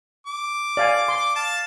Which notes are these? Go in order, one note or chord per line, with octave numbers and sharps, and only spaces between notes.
D6
D5 F5 G#5
C6
F5 A5